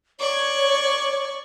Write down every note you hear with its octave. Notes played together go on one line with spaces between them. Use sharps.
C#5 D5 C#6